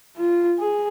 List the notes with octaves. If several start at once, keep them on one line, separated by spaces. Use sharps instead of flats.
F4
G#4